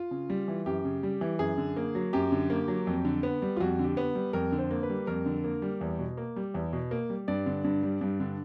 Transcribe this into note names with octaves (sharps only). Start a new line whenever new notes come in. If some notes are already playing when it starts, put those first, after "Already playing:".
Already playing: F4
C#3
G3
E3
F#2 G4
C#3
G3
E3
F#2 G#4
D3
A#3
F#3
F#2 G4
D3
A#3
F#3
F2
D3
B3
G3
F4
F2 F#4
D3
G4
B3
G3
F2 A#4
D3
C5
A#3
B4
G3
F2 A#4
D3
A#3
G3
E2
B2
A#3
G3
E2
B2
A#3
G3
G2 D5
D3
G2
G3
G2
D3